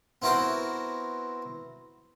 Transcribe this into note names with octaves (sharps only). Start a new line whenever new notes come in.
B3 C4 E4 F#4 A#4 C5